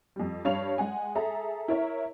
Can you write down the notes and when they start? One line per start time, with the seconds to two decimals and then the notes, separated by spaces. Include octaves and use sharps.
0.16 F2 G3
0.45 G2 C#5 F5 F7
0.78 G#3 F#5 G#5
1.15 G#4 A4 E5 A#5
1.68 E4 A#4 C#5 E5